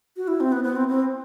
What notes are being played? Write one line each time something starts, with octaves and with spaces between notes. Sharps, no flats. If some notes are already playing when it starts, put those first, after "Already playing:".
F#4
E4
C4
B3
B3
C4
C4